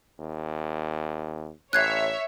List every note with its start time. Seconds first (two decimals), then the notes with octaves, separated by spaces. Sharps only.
0.19 D#2
1.73 A1 C#5 E5 F#6 G#6 C7